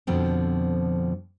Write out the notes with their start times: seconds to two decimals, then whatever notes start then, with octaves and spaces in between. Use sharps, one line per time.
0.07 F2 B2 D3 F3 C4